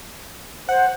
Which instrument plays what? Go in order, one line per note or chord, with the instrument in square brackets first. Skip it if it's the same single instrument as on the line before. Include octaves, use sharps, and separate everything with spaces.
[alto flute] C5 [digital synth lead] F#5